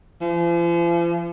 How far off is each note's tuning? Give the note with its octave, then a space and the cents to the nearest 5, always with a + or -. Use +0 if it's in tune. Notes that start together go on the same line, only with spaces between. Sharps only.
F3 -40